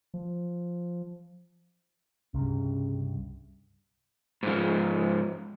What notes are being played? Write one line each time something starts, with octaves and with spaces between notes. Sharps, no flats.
F3
C2 G2 C#3
G#2 F3